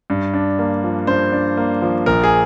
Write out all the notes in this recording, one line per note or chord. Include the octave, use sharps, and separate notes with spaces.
G2
D4
A#3
F3
G2 C5
D4
A#3
F3
A#1 A#4
G#4